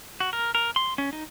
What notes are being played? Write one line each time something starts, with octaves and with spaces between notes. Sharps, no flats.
F#4
A#4
A#4
C6
C#4
D#4